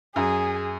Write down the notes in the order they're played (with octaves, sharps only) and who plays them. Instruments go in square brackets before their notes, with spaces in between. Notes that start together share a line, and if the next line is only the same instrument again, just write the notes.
[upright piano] F#2 [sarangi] G#4